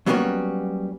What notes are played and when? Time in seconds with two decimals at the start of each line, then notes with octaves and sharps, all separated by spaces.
0.06 F#3 G3 A#3 B3 C#4 F#4